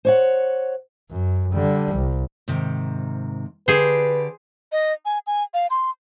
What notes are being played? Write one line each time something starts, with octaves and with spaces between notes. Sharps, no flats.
C5 C#5 F#5
F#2
D3 G3
C2
G#2 C3 D#3
D3 G4 G#4 B4 C5 D5
D#5
G#5
G#5
F5
C6